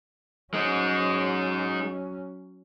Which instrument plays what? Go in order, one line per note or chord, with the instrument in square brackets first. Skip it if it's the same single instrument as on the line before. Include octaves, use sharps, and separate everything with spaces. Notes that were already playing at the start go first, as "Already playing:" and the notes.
[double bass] F#3 C#4 [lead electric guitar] G#3 D#4